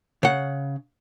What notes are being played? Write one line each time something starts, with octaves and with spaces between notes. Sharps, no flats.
C#3 F#5